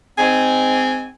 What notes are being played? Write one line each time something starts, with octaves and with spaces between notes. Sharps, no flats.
G#2 C4 G#5